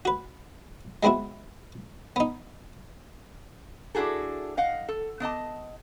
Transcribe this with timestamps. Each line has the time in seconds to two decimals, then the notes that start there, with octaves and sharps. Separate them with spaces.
0.05 F#4 B4
1.03 G#3 B3 C4 E4 F#4
2.16 B3 D#4
3.95 D4 E4 F#4 G#4 A4
4.57 D#5 F5 F#5
4.89 A4
5.20 B3 D4 D#5 A5